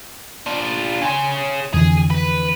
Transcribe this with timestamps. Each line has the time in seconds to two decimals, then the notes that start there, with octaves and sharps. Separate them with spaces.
0.47 D4 F4
1.02 C#4 G#4 G5 C6
1.73 F2 D3 E3 G#4
2.10 B4